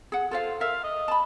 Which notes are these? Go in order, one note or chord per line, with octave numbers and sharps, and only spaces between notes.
G#4 F#5
F4 A4 C5 F5
A#4 E5 F5
D#5
A5 B5